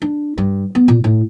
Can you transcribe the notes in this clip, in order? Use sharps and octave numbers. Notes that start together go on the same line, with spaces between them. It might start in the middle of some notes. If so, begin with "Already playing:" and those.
D4
G2
B3
A#2
A2